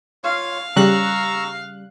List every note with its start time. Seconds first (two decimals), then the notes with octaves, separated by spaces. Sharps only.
0.24 F4 C#5 F5
0.76 C#3 G3 A#5 C#6 E6 F#6